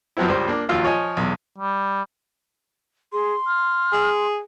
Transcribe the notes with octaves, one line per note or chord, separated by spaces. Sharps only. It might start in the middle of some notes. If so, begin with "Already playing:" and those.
F#2 F3 F#3 B3 C4 E4
C#2 G2 G3 C5
A#3 D4
A#1 D#2 F#3 F4 F5 E6
F3 C#5 D#5 G#5
B1 E2
G3
G#4 C6
F6
G#4